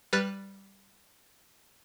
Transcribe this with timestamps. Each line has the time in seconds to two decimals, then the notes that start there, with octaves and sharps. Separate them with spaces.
0.13 G3 B4 F6 F#6 A6